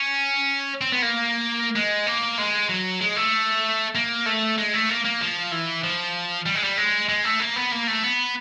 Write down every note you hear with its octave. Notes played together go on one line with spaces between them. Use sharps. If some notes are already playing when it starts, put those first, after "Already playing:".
Already playing: C#4
C4
B3
A#3
G#3
A#3
G#3
F#3
G#3
A3
A#3
A3
G#3
A3
A#3
A#3
F3
E3
F3
G3
G#3
G3
G#3
G#3
A3
A#3
B3
A#3
A3
B3